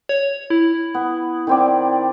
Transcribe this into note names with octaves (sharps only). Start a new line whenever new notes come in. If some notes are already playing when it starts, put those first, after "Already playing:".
C#5
E4
B3
D#3 C4 D5